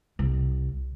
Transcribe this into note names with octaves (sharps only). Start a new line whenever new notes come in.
C2